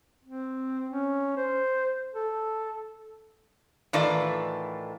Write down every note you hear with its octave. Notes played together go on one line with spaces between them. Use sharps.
C4
C#4
C5
A4
A2 D#3 E3 F4 A4 D5